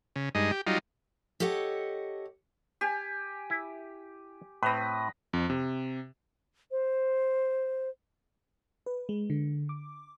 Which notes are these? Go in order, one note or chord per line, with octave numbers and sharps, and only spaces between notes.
C#3
G2 G#3 D#4
G4
F#3 G3 D#4 F4
G4 A4 C#5 D#5 F#5
G4 G#5
E4
A2 C4 B4 D#5
F2
C3
C5
B4
G#3
D3
D6